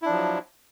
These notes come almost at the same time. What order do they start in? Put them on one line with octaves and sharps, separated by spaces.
E4 D4 F3 F#3